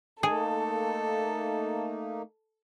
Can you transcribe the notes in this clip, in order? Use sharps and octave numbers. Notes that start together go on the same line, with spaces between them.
A3 A#3 D#4 G#4 A4